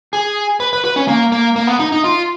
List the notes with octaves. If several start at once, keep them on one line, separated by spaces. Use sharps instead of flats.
G#4
B4
B4
B4
C#4
A#3
A#3
A#3
B3
D#4
D#4
F4